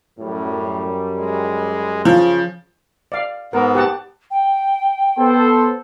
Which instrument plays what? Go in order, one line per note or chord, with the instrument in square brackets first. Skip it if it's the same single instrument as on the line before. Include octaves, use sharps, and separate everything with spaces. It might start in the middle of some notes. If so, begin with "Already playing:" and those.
[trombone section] F#2 G3 [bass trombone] A2
[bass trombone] G#3
[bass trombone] C#3 [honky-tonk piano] F3
[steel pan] D5 F5
[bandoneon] G#2 B3 [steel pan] A#4
[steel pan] G4 F#5 A5
[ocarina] G5
[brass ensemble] B3 A4 C5